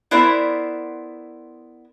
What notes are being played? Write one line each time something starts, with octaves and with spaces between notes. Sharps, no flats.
B3 E4 A#4 C5 D5 E5